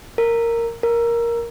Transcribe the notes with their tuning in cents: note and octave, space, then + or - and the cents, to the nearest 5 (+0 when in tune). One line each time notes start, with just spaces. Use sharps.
A#4 -10
A#4 +5